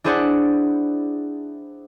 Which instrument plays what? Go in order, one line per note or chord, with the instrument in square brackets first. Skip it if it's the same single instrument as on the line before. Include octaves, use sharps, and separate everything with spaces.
[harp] D4 E4 G#4 C5 D5 F#5